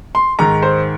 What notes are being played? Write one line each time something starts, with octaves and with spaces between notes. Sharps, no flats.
C6
G#2 D#3 A#5
C5